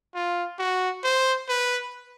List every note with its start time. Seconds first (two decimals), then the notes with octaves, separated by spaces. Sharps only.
0.15 F4
0.59 F#4
1.04 C5
1.49 B4